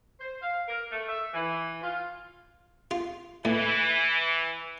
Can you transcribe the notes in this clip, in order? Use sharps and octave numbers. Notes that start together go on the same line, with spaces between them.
C5
F5
A#4
A3
E5
E3
F4
F4
A2 E3